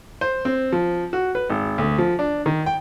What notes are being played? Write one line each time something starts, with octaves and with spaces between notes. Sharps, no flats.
C5
C4
F3
F#4
B4
G#1
D2
F3
D4
D#3
G5